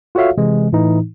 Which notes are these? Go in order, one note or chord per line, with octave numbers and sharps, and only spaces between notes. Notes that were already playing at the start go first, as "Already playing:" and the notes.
F4 F#4 A4 C#5 E5 F5
C3 E3 G#3
A2 E3 D#4